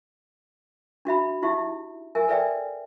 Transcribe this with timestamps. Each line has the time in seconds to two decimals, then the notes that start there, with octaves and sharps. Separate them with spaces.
1.05 D4 F#4 E5 B5
1.42 D#4 E4 G4 E5
2.15 A#4 E5 G#5
2.28 A4 B4 D5 E5 G5